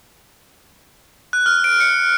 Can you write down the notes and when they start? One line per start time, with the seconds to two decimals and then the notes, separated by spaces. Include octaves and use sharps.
1.33 F#6
1.46 F6
1.64 D7
1.80 C#7